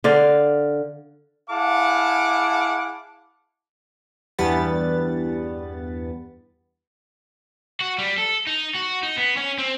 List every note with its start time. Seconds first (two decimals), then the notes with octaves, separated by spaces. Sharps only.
0.04 D3 D5 F5
1.50 E4 G#4 F5 F#5 A5 D6
4.38 E2 G2 G3 B3 F#5 A6
7.80 F#4
7.99 G3
8.18 A4
8.47 D#4
8.75 F#4
9.03 D#4
9.18 B3
9.37 C#4
9.58 C4